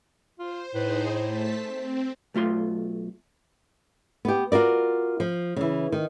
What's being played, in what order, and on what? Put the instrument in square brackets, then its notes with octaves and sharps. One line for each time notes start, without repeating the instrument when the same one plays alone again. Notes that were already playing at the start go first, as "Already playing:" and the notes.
[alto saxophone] F4 [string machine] C5
[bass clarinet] A2 [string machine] D#4 G#4 C5 [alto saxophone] B4
[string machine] A3 A5 B6 [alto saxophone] C5
[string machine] C4
[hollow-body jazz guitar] B1 A3 F4 C6
[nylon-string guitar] B3 G4
F4 F#4 A#4 D5
F3
C#3 E3
D#3